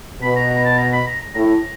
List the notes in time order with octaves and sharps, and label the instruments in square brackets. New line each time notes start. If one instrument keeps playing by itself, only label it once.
[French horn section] B2 [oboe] B5
[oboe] A#5
A#5
A5
A#5
B5
A#5
A#5
[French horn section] A2 [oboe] A#5